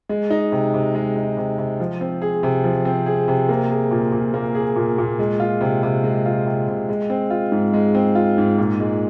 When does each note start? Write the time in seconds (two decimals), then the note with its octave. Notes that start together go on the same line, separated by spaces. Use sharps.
0.09 G#3
0.30 D#4
0.52 C3
0.74 C3
0.95 G#3
1.16 D#4
1.37 C3
1.58 C3
1.80 F3
2.01 C4
2.22 G#4
2.43 C3
2.64 F3
2.85 C4
3.06 G#4
3.28 C3
3.49 A#3
3.71 G#4
3.91 A#2
4.12 A#2
4.34 A#3
4.55 G#4
4.76 A#2
4.98 A#2
5.19 G#3
5.40 F4
5.61 C3
5.83 C3
6.04 G#3
6.26 F4
6.46 C3
6.68 C3
6.89 G#3
7.10 C4
7.30 F4
7.52 G#2
7.73 G#3
7.95 C4
8.15 F4
8.38 G#2
8.58 A#2
8.80 G#3